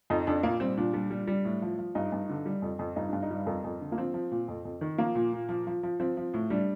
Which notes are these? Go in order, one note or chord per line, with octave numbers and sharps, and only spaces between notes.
F2 D#4
F2 D4
A#2 A#3
G3 C4
A#2 D4
G3 D4
G3
G3
A2
F3
F3
G2 D#4
G2
D3
G3
F2
F2
G2 D#4
G2 D4
D#4
G3
F2 A#4
F2
D3
A#3
F3 C4
F3
A#2
F2
F2
D#3
F3 A#3
A#2
A#2
F3
F3
F3
F3 C4
F3
A2
G3 D4